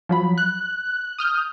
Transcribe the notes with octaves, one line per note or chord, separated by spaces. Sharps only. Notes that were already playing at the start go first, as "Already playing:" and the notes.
F3 F#3 B5
F#6
D#6 F6 G6